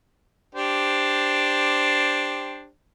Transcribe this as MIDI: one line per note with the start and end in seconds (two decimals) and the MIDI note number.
0.55 2.67 62
0.55 2.67 67
0.55 2.67 72